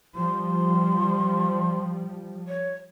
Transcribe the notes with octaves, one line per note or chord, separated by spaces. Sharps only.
F3 G3 C6
C#5